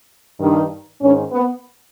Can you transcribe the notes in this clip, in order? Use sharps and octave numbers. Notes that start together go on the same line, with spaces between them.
G2 D#3
G#2 D#3 C#4
B3